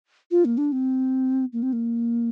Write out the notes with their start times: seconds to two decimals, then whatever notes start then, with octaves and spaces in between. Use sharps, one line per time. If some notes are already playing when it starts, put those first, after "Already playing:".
0.31 F4
0.45 A#3
0.58 D4
0.72 C4
1.53 A#3
1.63 C4
1.73 A#3